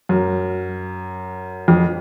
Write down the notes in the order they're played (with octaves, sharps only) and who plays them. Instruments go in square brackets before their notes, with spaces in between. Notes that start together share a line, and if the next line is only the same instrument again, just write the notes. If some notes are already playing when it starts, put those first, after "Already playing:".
[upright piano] F#2
F2